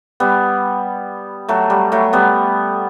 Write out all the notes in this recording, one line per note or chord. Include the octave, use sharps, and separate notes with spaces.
G3 B3
F#3 A3
G3
F#3 A3
G3 B3